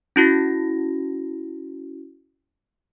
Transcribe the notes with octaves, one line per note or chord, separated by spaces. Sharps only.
C#4 E4 F#4 A#6